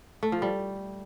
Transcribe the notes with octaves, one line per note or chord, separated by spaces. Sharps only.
A3
F3
G3